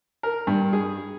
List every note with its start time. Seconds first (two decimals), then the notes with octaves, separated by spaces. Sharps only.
0.23 A#4
0.47 G2
0.73 G#4